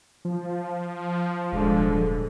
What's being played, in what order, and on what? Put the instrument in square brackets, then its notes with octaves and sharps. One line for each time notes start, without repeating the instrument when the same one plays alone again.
[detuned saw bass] F3
[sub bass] D#1 [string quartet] G#2 D3